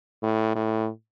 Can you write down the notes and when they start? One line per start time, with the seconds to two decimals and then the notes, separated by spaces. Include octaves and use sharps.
0.23 A2
0.55 A2